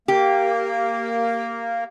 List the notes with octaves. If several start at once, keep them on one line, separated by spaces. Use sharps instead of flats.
A#3 G4